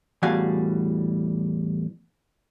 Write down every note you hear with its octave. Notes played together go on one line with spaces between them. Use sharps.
E2 A2 G3 F#4 F5 G#5